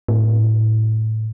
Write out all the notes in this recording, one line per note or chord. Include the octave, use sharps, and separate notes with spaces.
A2